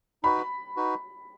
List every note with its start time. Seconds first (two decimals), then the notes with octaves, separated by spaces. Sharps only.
0.23 D#4 F#4 B4 B5
0.76 D#4 F#4 B4